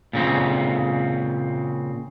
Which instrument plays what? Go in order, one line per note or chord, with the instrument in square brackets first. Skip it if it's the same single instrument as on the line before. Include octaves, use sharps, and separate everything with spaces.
[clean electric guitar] A#2 C#3 C4